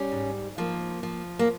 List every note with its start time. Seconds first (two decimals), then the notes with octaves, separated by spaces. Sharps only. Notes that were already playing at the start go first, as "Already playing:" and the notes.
Already playing: G3 C#4
0.12 G#2
0.58 F3 A#3
1.03 F3
1.39 A#3